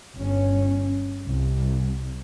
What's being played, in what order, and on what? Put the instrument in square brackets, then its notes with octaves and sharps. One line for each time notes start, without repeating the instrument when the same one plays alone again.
[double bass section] G1 C#4
C2